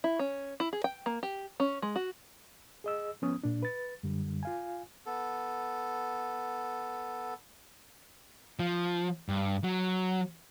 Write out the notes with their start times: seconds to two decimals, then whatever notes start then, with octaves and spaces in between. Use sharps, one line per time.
0.04 E4
0.19 C#4
0.60 E4
0.73 G#4
0.84 G5
1.06 A#3
1.23 G4
1.60 C#4
1.82 G#3
1.96 F#4
2.84 G#4 D#5 E6
3.22 F3 B3 C#4 D#6
3.43 A#2 D4
3.63 B4 A6
4.03 F#2 D3 G3
4.43 F4 F5 G#5
5.06 B3 A4
8.59 F3
9.29 G2
9.64 F#3